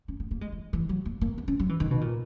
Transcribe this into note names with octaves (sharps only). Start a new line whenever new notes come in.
C#4
B3
A#3
G#3
E3
E3
F#3
A#3
A#3
B3
C#4
F#3
E3
D#3
B2
A#2